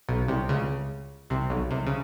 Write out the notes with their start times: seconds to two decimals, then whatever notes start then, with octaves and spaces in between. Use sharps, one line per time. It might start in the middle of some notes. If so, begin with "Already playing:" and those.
0.09 B1 B2
0.28 C2 C3
0.49 C#2 C#3
1.30 C2 C3
1.50 B1 B2
1.71 C2 C3
1.87 C#3